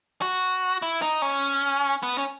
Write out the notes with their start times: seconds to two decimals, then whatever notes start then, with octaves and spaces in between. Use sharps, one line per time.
0.22 F#4
0.82 E4
1.02 D#4
1.22 C#4
2.03 B3
2.18 C#4